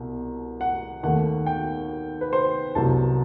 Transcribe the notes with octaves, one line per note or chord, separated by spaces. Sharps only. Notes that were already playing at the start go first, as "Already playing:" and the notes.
Already playing: C2 B2
F#5
D#2 D#3 A3 F#5
G5
B4
C5
C2 C3 F#3 B3 A5